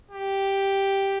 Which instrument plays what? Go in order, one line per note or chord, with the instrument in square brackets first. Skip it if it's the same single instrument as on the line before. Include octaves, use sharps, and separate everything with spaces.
[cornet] G4